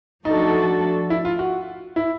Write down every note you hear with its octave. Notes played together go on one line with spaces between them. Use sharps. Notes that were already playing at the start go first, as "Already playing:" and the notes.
F3 A3 D4 D#4 F#4 A4
E4
F4
F#4
E4